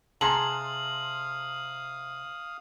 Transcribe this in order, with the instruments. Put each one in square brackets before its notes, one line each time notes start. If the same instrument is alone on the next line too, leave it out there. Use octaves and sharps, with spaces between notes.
[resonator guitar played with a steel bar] C3 G#4 [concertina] F5 D#6 [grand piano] A5 A#5 C6 [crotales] F#7